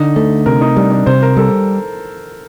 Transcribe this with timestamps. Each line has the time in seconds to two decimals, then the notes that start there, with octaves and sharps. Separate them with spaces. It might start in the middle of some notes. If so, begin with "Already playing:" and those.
Already playing: D3 D#4
0.16 A3
0.46 C3 A#4
0.61 D#4
0.77 G3 D4
0.92 D4
1.06 C3 C5
1.22 A#4
1.37 G3 A4